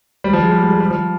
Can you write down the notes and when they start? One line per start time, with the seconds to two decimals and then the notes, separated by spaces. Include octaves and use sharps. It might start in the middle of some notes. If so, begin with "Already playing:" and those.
0.24 G3
0.33 F3
0.42 G#3
0.52 G3
0.62 G3
0.71 G#3
0.80 G3
0.90 F3